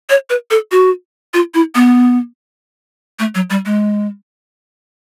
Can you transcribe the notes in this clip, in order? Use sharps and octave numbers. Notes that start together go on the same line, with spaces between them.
C#5
B4
A4
F#4
F4
E4
B3
A3
F#3
G3
G#3